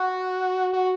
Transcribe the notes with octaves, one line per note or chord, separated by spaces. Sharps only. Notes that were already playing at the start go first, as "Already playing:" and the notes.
Already playing: F#4
F#4